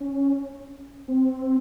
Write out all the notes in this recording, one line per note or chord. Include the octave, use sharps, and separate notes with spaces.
C#4
C4